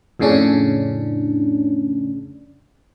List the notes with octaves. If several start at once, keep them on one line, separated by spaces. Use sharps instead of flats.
F2 A2 C#3 C#4 D4